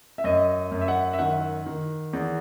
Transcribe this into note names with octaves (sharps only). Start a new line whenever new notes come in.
E5
F#2 D#5
F#2
E5
F#5
E5
D#3 F#5
D#3
E2